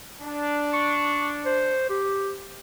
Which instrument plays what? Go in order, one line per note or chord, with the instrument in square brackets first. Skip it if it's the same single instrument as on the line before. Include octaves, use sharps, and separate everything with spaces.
[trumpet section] D4
[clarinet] C#6
C5
G4